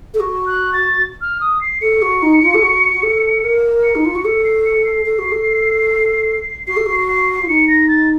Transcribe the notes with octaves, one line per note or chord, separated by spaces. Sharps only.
A4
F#4
F#6
A6
F6
D#6
C7
A4 C#7
F#4
D#4
F4
A4
F#4
F#4
A4
A#4
C#7
D#4
F4
F#4
A4 C#7
C7
C#7
C7
A4
F#4
A4
F#4 C7
A4
F#4
C7
F4
D#4 C#7
A#6
A6